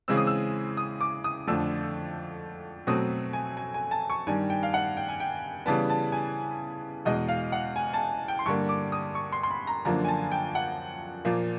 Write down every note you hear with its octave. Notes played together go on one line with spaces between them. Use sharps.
C#3 E3 G#3 C4 E6
D#6
E6
D#6
D6
D#6
F2 D3 F3 A3 E6
B2 F#3 A3 C4 D#6
G#5
G#5
G#5
A5
C#6
G2 D#3 G3 G#5
G5
F5
F#5
G5
G#5
G5
C#3 E3 G3 B3 A5
A5
G#5
E2 B2 G#3 D#5
F5
F#5
G#5
A5
G5
C6
G2 D3 G3 A#3 C#6
D6
D#6
C#6
C6
C6
B5
A#5
F#2 D3 F3 A#3 A#5
G#5
A5
G5
F#5
A#2 F3 A#3